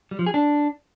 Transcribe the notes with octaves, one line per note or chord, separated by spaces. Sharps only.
G3
F3
G#4
D4